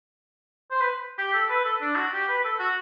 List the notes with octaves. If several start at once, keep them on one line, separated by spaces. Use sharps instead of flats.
C5
B4
G4
A4
B4
A4
D4
F#4
G4
B4
A4
F#4